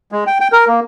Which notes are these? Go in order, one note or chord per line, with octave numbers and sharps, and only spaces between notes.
G#3
G5
G5
A#4
A#3